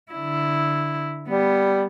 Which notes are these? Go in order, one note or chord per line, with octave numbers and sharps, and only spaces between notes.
D3 E4
G3 B3